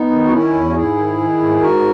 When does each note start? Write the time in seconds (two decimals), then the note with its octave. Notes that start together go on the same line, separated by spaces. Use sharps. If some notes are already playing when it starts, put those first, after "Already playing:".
Already playing: B3 D#4
0.10 D#3
0.25 F#4
0.31 D#3 C#4 E4
0.53 E2
0.70 F#4
0.75 G#2 E4 G#4
0.97 D#3
1.18 D#3
1.40 G#2
1.61 G#2 F#4 A#4